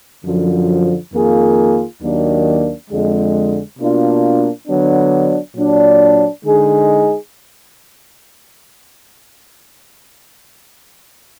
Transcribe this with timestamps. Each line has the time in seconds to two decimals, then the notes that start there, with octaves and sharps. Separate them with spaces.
0.25 F#2 D3 F3
1.13 F2 D#3 A#3 F4 G#4
2.02 D#2 D#3 F#3 A#3 D4
2.91 F2 D3 G#3
3.79 B2 A#3 D4 F4
4.68 D3 F#3 B3 D4
5.56 A#2 F#3 D4
6.45 D3 G#3 D#4 G#4